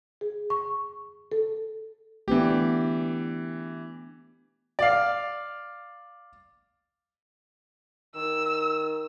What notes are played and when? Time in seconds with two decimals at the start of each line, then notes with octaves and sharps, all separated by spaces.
0.21 G#4
0.50 C#6
1.32 A4
2.28 E3 A3 B3 D4 G4
4.79 D5 F5
8.16 D#3 E6